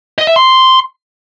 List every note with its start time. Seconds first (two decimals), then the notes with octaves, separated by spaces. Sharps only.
0.18 D#5
0.27 E5
0.36 C6